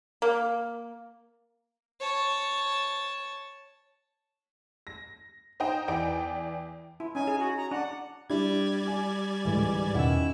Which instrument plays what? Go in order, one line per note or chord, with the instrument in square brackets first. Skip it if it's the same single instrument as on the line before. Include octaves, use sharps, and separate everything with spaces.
[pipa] A#3
[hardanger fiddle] C#5 A5
[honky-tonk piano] A#6
D#4 C5 D#5 G5
E2 E3 D5 G5 D7
[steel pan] E4
[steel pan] C#4 D#4 [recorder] G#5
[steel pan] G#4
[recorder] F#4
A#5
[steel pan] D4 [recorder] F#5
[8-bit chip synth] G3 D5 G#6 [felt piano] D4 E4 G4
[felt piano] G#5
[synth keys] C#2 G#2 D3 [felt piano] E3 G#3
[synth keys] E2 B2 F#5 [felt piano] D#3 C#4 [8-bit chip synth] E4 E6